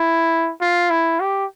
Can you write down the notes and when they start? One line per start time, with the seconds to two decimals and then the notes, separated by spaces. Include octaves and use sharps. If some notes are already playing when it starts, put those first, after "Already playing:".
Already playing: E4
0.61 F4
0.90 E4
1.20 G4